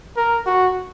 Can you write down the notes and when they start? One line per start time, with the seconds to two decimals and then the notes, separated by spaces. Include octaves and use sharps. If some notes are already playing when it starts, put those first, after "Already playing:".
0.17 A#4
0.46 F#4